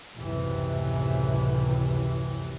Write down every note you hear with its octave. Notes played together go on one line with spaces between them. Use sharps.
F1 C#2 F#2 A2 C3 E3